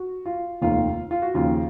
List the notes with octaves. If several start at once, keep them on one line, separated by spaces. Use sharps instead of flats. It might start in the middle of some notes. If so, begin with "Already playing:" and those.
Already playing: F#4
F4
F1 D#2 D#3 F4
F4
F#4
D#2 C#3 F3 F4